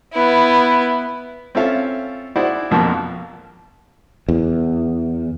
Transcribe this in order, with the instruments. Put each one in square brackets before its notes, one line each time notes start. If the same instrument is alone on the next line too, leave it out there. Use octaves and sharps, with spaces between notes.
[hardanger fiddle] B3 E4
[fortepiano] C4 C#4 F4 A4 E5 F5
E4 F#4 G#4 C5 D5
A#1 F2 B2 F3 A#3
[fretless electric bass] E2